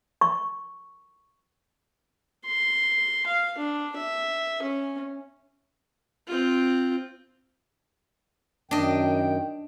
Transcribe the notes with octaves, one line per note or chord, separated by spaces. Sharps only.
C#6
C6
F5
D4
E5
C#4
C4 F4
F#2 D#3 D4 D#5 G5